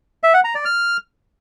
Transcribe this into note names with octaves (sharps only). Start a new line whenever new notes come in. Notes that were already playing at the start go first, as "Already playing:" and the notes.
E5
F#5
A#5
D5
F6